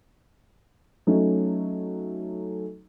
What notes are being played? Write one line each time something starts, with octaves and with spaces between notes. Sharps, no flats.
F#3 A3 C#4 D#4